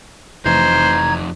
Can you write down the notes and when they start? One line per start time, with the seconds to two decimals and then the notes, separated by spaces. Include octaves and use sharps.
0.45 F1 F2 E3 D#4 C5 A#5 G#6